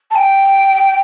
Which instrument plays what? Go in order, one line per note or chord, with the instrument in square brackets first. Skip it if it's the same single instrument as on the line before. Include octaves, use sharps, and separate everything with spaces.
[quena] A5
G5